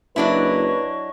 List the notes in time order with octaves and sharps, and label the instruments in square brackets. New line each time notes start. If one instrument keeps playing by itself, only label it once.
[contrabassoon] F#1 [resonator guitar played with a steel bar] F#3 D4 E4 [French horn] B4 [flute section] C#5 D#5 C#6